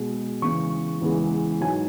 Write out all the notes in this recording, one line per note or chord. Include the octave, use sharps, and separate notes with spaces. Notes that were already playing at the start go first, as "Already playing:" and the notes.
Already playing: B2 G#3
E2 C#3 E3 G#3 C#6
E2 C#3 E3 G#3
G#2 F#3 G#5